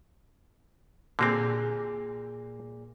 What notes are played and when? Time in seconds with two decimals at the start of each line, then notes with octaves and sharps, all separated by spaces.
1.19 A#2 D3 A#3 C4 G4 G#4